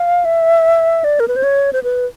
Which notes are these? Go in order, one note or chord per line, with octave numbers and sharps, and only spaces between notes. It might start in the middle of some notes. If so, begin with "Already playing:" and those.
Already playing: F5
E5
D5
A#4
B4
C5
C#5
C5
B4